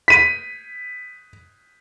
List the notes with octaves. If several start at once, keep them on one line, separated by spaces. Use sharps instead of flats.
B6 D#7